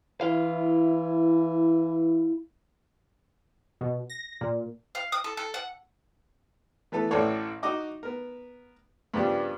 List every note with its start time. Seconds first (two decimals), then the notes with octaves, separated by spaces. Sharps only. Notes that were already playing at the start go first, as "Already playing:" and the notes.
0.21 E3 E4 F5
3.81 B2
4.10 A#6
4.41 A#2
4.95 F5
5.12 D#6
5.24 A4
5.37 A4
5.54 F#5
6.92 E3 A3 B3 A4
7.11 A1 A2 A4 B4 C#5 D5
7.63 D#4 F#4 D#5 D6
8.03 B3 A#4
9.14 G2 C#3 F3 B3 D4 G4